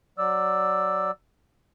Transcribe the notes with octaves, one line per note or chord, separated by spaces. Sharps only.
F#3 D5 E6